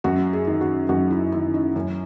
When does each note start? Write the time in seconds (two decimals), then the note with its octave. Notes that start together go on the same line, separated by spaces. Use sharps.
0.04 F#2 F#4
0.33 G#4
0.47 D#3
0.61 F#4
0.89 F#2 F#4
1.11 E4
1.32 D#3 E4
1.54 D#4
1.76 F#2 C#4